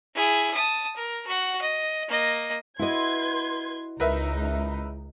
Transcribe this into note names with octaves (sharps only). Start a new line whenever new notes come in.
E4 G#4
A5 D#6
A#4
F#4 F#5
D#5
A#3 D#5
E4 F#4 B4 D#5 C6 G#6
C#2 D#4 A#4 B4 E5